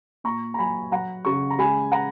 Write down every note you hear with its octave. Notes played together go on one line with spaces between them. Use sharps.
A#2 A#5 C#6
A#5
F#3 G#5 B5
F#3 F#5 A#5
C#3 A#5 C#6
A#5
G#3 G#5 B5
F#5 A#5